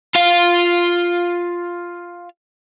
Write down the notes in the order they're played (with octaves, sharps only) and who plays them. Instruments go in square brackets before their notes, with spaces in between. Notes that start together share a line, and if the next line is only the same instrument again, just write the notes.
[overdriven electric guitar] F4 F5